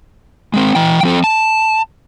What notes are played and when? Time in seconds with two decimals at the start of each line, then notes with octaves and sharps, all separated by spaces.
0.54 G#3 C4
0.75 E3 G5
1.03 F3 C4 A4
1.24 A5